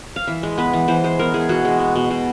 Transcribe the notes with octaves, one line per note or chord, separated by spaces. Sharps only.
F5
E3 E5
G#3
B3 B4
E3
E3 C5
G#3 C5
B3 A#4
E3 G#4
B2 F#4
G#3
B3
B2
B2